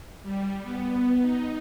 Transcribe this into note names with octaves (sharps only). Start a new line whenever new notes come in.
G3
B3
D#4